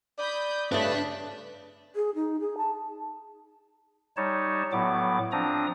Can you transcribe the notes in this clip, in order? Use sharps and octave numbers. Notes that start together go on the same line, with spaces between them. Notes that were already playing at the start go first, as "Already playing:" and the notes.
D5 B5 D#6 G6
G2 C#3 A3 D4 B4 A5 F#6 B6
G#4
D#4
G#4
A5
G3 D#4 C#5 A5
A2 F#3 B3 D6
F3 C4 D4 A#5 D#6